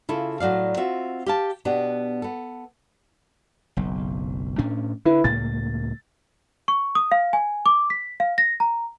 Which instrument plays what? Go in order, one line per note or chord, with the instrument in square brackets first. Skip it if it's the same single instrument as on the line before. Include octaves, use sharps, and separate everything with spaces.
[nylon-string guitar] C#3 E4 F4 A4
A2 F#3 D5 F5
C4 F4 F#4 E5
G4 F5 A5
B2 B3 D4 G4
B3 A4
[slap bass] F#1 B1
A2 C#4 D4
[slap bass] D3 [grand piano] E4 B4
[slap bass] C#2 A2 A#3 [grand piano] A6
[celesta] C#6
D#6
F5
G#5
D6
B6
F5
A#6
A#5